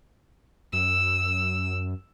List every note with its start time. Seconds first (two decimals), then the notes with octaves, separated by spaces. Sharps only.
0.73 F#2 E6